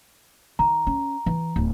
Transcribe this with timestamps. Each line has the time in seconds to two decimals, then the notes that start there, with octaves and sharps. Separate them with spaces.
0.59 D#3 A#5
0.87 C#4
1.26 E3
1.56 D1